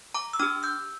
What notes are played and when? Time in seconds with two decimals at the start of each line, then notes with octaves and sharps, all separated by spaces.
0.14 A#5 D6
0.33 E6
0.40 D4 G4 D6 F6
0.63 E6 G6